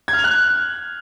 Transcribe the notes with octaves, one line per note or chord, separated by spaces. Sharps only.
G#6
F6
F7
F#6